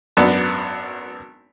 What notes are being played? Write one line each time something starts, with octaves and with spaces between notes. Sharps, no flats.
G#1 F#2 B3 D4